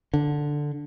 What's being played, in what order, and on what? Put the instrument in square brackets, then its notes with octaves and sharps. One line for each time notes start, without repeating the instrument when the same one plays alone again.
[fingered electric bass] D3